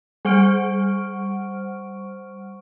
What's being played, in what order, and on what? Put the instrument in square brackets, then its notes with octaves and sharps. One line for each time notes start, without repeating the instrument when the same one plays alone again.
[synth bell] G3 C5 F#5 C#6 F6 D7